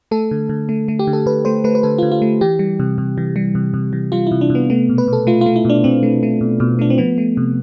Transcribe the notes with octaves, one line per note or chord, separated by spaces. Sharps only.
A3 A4
D3
D3
A3
A3
G4
D3
A4
D3 B4
A3 C5
A3 B4
B4
D3 A4
F4
D3
F4
A3
E3 G4
G3
C3
C3
E3
G3
C3
C3
E3
G3 F4
C3 E4
D4
C3
B3
A3 B3
B2
B4
B2 A4
A3 F4
A3 F4
E4
B2 D4
B2 C4
A3
A3
B2
B2
A3 D4
C4
F3 B3
A3
C3